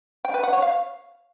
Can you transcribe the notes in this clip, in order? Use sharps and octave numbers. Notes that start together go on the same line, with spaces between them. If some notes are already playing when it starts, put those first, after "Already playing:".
G5
B4
F#5
C#5
F5